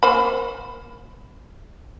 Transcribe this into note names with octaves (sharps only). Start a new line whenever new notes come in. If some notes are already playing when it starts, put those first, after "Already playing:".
A#3 C5 B5